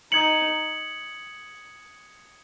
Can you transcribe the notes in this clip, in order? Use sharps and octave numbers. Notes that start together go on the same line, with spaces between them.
D#4 D#6 G#6 C#7 F#7